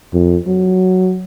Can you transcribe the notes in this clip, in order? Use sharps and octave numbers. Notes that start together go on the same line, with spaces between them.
F2
F#3